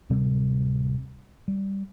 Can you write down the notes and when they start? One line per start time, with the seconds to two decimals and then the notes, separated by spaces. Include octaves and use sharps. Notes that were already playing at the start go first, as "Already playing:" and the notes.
0.10 D1 C3 G3 C4
1.48 G3